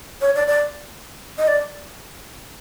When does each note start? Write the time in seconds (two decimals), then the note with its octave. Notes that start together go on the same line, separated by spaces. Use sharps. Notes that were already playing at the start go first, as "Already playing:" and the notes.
0.21 C#5
0.35 D5
0.48 D5
1.38 D#5
1.48 D5